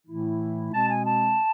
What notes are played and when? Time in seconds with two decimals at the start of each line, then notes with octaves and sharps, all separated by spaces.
0.06 A2 E3 A3 E4
0.73 B2 G#3 C4 A5
0.89 G#5
1.06 A5